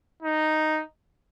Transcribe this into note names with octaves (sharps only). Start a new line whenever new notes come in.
D#4